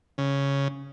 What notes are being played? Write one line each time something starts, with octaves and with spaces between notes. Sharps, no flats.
C#3